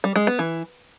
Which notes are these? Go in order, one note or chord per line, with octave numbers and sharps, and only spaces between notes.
G3
G#3
B3
E3